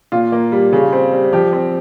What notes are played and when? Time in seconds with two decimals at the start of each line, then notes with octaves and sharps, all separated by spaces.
0.12 A#2 F4
0.32 A#3
0.52 G3
0.72 C#3
0.93 C4
1.13 G3
1.33 F3 G4
1.53 C4